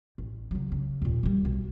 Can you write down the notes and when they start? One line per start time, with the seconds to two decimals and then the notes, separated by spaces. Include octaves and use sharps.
0.18 A1
0.51 C#3 F#3
0.72 C#3
1.02 D#2 A#2
1.23 D#3 G3
1.45 B1